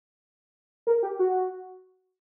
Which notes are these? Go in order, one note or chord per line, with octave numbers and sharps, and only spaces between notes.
A#4
G4
F#4